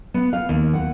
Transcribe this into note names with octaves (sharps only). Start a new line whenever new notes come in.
B3
F5
D#2
F#5